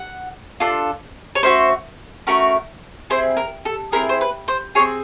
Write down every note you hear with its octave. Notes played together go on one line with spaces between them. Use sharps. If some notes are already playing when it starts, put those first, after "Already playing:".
Already playing: F#5
D4 F4 A4
C#5
A3 C#4 F#4 C5
A3 C#4 F#4 A#4
C4 E4 G#4 C5
A#4
A4
C4 E4 G#4 A#4
C5
B4
C5
C4 F4 G#4 C#5